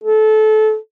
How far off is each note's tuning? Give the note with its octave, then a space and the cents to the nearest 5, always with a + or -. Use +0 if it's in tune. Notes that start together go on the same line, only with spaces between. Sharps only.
A4 -25